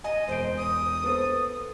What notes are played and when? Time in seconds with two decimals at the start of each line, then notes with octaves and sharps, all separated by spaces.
0.04 D#5 G#5
0.28 E1 C5 D7
0.57 D#6
1.04 B3 A4 C5